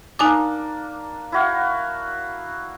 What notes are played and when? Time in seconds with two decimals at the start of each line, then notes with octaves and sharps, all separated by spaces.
0.19 A#3 D4 D#4 G#5 D6
1.32 E4 F#4 F5